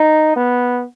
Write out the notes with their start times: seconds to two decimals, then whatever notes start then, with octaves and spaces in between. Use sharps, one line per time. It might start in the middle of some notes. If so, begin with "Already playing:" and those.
Already playing: D#4
0.36 B3